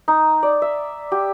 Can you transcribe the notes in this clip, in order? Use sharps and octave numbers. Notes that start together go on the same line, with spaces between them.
D#4
D5
E5
G4